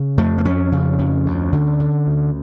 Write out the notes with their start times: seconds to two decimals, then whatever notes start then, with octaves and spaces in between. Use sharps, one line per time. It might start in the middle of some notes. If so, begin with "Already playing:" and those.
Already playing: C#3
0.18 F2 A3
0.38 A#3
0.45 F2 C#4
0.72 C#3
0.99 F2
1.26 D2
1.53 D3
1.80 D3
2.07 D2